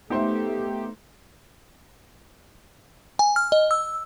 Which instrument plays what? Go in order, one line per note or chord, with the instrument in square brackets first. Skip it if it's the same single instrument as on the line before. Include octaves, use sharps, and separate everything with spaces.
[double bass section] A3 [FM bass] B3 [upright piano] D#4 C5 E5 [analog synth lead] G4
[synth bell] G#5
F6
D#5
E6